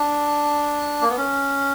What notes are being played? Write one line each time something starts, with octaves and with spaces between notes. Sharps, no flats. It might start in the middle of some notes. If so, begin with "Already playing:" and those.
Already playing: D4
A#3
B3
C#4